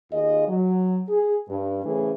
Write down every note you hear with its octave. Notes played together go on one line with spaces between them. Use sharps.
D#2 F4 G#4 D#5
F#3
G#4
G2
A2 C#3 E3 A3 C4 G#4